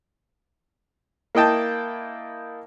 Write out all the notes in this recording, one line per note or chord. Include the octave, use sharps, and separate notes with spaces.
A#3 E4 D#5 G5 A5